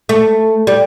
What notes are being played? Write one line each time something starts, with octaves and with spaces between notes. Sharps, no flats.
A3
G3